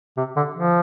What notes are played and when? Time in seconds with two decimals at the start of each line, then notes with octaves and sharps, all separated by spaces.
0.17 C3
0.36 D3
0.54 F3